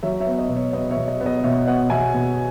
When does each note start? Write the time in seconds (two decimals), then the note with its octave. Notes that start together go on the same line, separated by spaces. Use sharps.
0.03 F#3 C#5 E5
0.20 C#5 E5
0.26 B3
0.32 C#5
0.38 D#5
0.49 B2
0.56 C#5
0.73 B3 D#5
0.91 C#5 E5
0.97 B2
1.08 D#5
1.21 B3
1.26 D#5
1.43 B2 C#5 E5
1.67 B3 D#5 F#5
1.90 B2 E5 G#5
2.14 B2